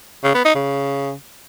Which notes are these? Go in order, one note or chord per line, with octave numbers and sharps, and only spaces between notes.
C#3
B3
D#4
C#3